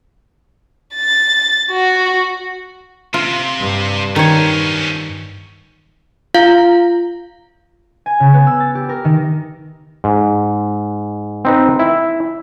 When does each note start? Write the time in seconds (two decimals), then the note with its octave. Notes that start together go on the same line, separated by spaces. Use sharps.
0.95 A6
1.71 F#4
3.14 C3 F4
3.59 G2
4.16 D#3 F3 C#4 C#5
6.34 F4 F5
8.06 G#5
8.20 C#3
8.34 B3
8.47 E6
8.60 A6
8.75 G4
8.89 A#4
9.05 D#3
10.04 G#2
11.45 C4 D#4 B4
11.79 E4